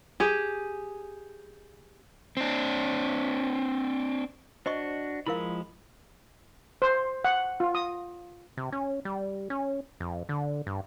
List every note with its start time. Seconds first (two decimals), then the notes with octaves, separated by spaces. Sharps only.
0.20 G4 G#4
2.37 C4 D4
4.66 D4 F#4 C5 D#5 C#6
5.27 F3 G#3 E4 A#4 F5 B5
6.82 C5
7.25 F#5
7.60 F4
7.75 D#6
8.57 C3
8.72 C#4
9.05 G3
9.50 C#4
10.00 F2
10.29 D3
10.67 G2